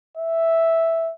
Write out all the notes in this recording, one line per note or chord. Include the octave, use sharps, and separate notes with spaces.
E5